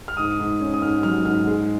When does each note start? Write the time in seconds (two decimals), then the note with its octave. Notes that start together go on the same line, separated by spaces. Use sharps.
0.08 F6
0.17 G#2 D#6
0.40 G#2
0.60 C#4
0.74 D#6
0.82 G#2 F6
1.03 F#3 F6
1.25 G#2 F6
1.47 G#3